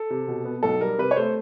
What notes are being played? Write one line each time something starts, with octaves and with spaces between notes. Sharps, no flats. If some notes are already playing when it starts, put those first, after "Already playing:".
Already playing: A4
C3
B2
B3
B1 A4
G3 A#4
C3 B4
C#5
A3 C5